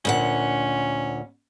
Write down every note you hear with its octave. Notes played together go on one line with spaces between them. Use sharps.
D2 A#2 C#4 F#5